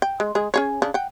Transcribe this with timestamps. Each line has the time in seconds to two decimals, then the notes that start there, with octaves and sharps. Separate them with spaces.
0.02 G5
0.20 G#3
0.35 G#3 G#4
0.54 C#4 G#4 C#5
0.82 C#3 D4
0.94 F#5 G5